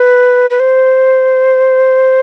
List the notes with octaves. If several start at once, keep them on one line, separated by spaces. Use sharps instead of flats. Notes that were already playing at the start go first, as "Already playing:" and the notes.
Already playing: B4
B4
C5